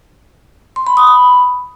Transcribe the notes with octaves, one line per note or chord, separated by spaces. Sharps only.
C6
B5
D#6
B5